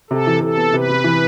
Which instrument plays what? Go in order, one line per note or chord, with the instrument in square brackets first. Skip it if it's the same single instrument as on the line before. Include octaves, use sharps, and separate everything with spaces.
[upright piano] C3 [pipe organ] A4
[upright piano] E3
[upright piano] C3 [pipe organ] A4
[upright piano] B3
[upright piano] C3 [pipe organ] B4
[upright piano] C3
E3